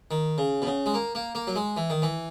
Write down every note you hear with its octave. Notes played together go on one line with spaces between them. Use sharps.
D#3
C#3
B2
C#3
G#3
A#3
A#3
A#3
F#3
G#3
E3
D#3
E3